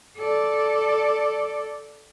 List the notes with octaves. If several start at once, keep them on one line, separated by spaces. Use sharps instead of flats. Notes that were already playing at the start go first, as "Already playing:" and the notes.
A4 D5